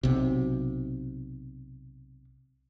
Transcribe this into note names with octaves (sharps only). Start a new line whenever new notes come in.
B1 C3